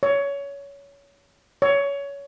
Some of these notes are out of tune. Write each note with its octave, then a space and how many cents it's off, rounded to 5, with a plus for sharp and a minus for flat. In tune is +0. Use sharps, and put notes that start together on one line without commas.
C#5 +20
C#5 +20